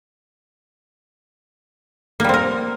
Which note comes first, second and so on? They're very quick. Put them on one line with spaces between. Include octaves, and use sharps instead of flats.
A#3 G3 C4 A#4